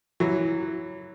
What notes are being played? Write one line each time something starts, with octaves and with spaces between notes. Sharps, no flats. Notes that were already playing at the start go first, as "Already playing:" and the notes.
E3 F#3